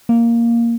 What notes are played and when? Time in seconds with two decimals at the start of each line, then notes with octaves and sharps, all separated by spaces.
0.09 A#3